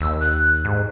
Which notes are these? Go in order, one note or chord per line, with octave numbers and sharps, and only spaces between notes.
D#2 E6
F#6
G#2